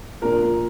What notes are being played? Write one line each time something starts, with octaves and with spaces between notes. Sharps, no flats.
A#2 F3 A#3 D4 A#4